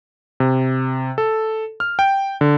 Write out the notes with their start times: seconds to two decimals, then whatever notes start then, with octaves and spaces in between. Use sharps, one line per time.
0.40 C3
1.18 A4
1.80 F6
1.99 G5
2.41 D3